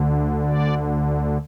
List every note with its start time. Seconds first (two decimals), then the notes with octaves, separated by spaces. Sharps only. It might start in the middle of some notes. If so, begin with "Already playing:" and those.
Already playing: D2 D3
0.47 D5